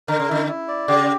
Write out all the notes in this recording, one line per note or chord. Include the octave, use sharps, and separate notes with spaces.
D3 A#4
C#3
D3 E4
E4
D5
C#3 G4